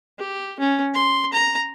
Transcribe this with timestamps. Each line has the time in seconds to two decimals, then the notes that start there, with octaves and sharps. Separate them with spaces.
0.19 G4
0.59 C#4
0.94 C6
1.33 A#5